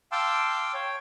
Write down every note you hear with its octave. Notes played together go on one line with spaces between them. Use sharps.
F5 G5 A5 C6 D6 E6
C#5 G5